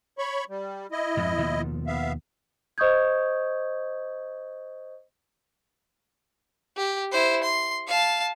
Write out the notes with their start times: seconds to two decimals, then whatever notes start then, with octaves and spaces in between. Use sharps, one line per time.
0.18 C#5 B5 C#6
0.49 G3
0.92 E4 D#5
1.17 F2 G#2
1.38 D#2 B2 F3
1.87 B3 E5 F5
2.78 C5 D#5 C#6 D#6 G6 G#6
6.77 G4
7.12 E4 C5
7.43 C6
7.88 F5 A5